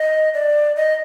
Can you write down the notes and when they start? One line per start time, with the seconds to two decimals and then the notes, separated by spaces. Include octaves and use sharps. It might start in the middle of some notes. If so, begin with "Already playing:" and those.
Already playing: D#5
0.34 D5
0.76 D#5